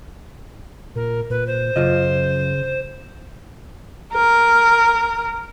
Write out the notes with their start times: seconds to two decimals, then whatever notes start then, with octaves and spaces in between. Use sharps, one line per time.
0.95 A#2 A#4
1.30 A#2 B4
1.47 C5
1.76 F#2 C#3 F4 D#5
4.14 A#4